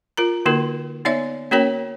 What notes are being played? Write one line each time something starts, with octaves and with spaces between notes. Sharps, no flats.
F4 A#4 A#5
D3 A#3 D#4 F#4 A#4
B3 D#4 C#5 D5 E5
A#3 C#4 F#4 A#4 C#5 G5